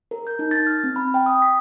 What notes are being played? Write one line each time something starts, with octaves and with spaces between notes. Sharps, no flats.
A#4
G6
D#4
A6
F6
C4
B5
G5
D#6
B6